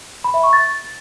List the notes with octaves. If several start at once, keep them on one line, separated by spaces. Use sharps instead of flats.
B5
E5
C#6
A6